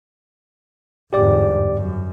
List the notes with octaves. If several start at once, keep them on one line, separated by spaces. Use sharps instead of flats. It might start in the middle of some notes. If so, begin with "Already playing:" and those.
G1 E2 G#2 G4 D5 D6
F#2